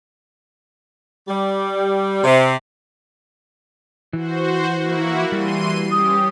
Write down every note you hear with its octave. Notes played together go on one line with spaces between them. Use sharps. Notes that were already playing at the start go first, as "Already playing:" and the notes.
G3
C3
E3 F#4 C5
A#3 E4 F#4
E3 G3 C6 D#7
C#4 G4 D#6